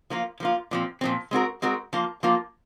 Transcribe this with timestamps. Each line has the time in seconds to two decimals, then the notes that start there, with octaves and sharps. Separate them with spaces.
0.10 F3 A#3 F4
0.40 F3 A#3 F4
0.71 A#2 F3 C4
1.01 A#2 F3 C4
1.31 G#3 C4 F#4 A#4
1.62 G#3 C4 F#4 A#4
1.93 F3 A#3 F4
2.23 F3 A#3 F4